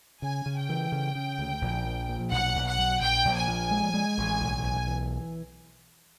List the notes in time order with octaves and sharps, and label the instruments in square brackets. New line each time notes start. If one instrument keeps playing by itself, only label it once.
[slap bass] C#3 [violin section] G#5
[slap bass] C#3
[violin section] G5
[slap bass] E3
C#3
C#3
D2
A#1
F3
A#2
[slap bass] B1 [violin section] F#5
[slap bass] B1
[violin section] F#5
[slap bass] B1
[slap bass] A#1 [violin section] G5
[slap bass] A#1
[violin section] G#5
[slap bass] F3
G#3
G#3
A1
B1
B1
E3